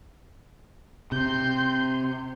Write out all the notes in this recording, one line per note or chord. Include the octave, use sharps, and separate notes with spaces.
C3 C6 G6